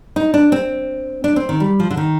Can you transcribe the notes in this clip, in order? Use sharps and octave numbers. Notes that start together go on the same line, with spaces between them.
D#4
D4
C4
D4
C4
D#3
G3
F3
D3
D#3